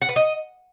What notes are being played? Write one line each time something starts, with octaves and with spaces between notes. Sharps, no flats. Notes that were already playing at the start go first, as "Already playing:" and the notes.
F#5
B4
D#5